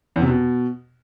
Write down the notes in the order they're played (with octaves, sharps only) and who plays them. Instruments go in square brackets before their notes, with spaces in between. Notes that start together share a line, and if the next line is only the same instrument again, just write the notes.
[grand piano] E2
C3
B2